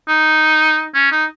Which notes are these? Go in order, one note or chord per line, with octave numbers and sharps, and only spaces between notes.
D#4
C#4
D#4